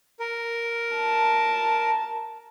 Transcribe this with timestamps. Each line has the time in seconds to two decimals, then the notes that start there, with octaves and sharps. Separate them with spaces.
0.20 A#4
0.96 A5